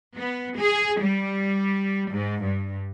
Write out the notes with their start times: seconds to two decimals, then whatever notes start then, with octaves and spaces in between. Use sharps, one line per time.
0.17 B3
0.59 G#4
1.01 G3
2.12 G#2
2.42 G2